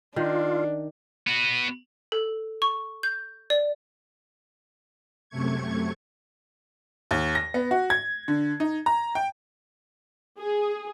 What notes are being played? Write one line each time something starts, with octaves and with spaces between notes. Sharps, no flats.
D#3 D4 F4
B3 F#4
A4
C#6
G6
D5
F#2 C3 A3 C#6 G#6
D#2
A#6
B3
F#4
G#6
D3
D#4
A#5
G5
G#4